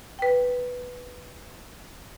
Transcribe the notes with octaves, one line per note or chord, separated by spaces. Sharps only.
B4 G5